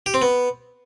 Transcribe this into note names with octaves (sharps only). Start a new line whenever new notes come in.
G4
C4
B3